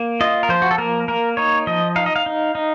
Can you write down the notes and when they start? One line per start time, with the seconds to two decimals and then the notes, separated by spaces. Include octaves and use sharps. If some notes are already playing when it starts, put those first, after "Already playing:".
Already playing: A#3
0.21 F4 D#5
0.43 A#4
0.49 F3 C5
0.62 F#4
0.71 A4
0.78 A#3 A#4
1.08 A#3 A#4
1.37 D#4 C#5
1.67 F3 D#5
1.96 D#4 F5
2.06 D#5
2.16 F5
2.26 D#4
2.55 D#4